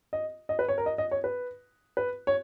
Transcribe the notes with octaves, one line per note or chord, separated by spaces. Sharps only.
D#5
D#5
B4
C#5
A#4
D#5
D#5
C#5
B4
B4
C#5